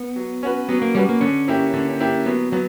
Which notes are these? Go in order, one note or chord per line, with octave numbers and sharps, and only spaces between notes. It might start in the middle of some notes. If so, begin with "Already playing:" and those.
Already playing: B3
F#3
C#4 F#4 B4
F#3 B3
A#3
G3 C#4 F#4 B4
A#3
D3 C#4
A#3 E4 G4
D3
A#3 E4 G4
F#3 B3
F#3 B3